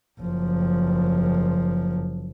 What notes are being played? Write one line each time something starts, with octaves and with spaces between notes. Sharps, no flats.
F#1 F3